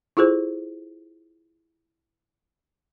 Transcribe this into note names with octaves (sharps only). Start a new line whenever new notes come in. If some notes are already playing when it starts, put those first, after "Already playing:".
E4 F4 G#4 A4 C5